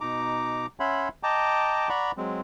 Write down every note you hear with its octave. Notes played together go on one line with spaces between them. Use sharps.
B2 D#4 A#5 D6
C#4 C#5 E5 F#5 B5 C6
D#5 G5 A5 A#5 D6
D5 F#5 A#5 B5 C#6
F#3 G#3 C4